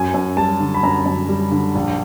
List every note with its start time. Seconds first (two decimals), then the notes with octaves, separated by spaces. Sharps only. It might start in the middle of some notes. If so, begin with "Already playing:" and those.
Already playing: F#2 G#5
0.14 F#2
0.37 G3 A5
0.60 D3
0.74 B5
0.83 F#2 A#5
1.06 F#2
1.29 G3
1.52 D3
1.75 A#1